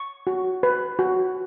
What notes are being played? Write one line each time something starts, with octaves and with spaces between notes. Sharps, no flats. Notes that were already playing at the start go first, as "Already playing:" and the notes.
Already playing: C#6
F#4
B4
F#4